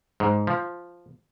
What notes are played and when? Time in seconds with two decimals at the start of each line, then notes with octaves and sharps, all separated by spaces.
0.20 G#2
0.47 F3